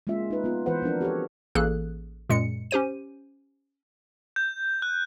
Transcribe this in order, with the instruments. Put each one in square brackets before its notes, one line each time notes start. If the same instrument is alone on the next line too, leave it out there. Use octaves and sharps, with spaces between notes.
[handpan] G#3 A#3 C#4 F4 E5
D#4 B4
B3 F4
E3 B4 C5 F#5
F3 C4 D4 A#4
F#4 G4 A4 C#5
[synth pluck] A1 A#3 G#4 A4 F#6
F#2 A#2 G#3 C#7
C#4 G4 C5 D#7
[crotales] G6
F#6